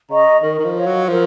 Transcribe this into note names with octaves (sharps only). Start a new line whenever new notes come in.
C#3 D#5 A#5 C#6
D#3 A#4
D#3
F3
C#5 F5
F#3
F3 A#4